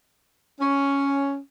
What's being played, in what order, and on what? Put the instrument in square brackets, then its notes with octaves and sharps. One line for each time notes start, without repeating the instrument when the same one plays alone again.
[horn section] C#4